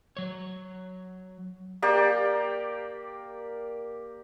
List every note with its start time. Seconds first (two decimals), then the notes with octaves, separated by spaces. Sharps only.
0.17 F#3 C#5
1.82 A#3 G4 D5 G5